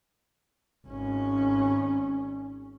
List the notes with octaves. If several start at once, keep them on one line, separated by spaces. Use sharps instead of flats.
G#1 C#4